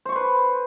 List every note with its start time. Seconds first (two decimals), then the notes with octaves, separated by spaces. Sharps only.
0.05 C5
0.09 C#6
0.12 C6
0.16 B4